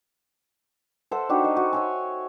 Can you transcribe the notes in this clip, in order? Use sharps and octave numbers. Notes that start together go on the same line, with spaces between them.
A4 C5 E5 F#5
D4 D#4 F#4 G4
D#5
F#4
C#5 E5 G#5